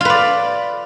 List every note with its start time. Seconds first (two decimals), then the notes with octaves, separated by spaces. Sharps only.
0.01 F4
0.05 B4
0.10 D5